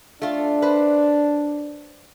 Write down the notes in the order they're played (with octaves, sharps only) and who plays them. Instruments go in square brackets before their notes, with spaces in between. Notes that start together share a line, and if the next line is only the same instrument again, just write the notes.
[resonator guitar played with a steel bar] A3 F4 [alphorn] D4
[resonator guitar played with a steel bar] B4 C5